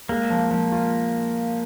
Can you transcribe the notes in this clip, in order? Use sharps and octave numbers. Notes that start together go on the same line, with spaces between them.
G#3 A#3
F3
F3
F4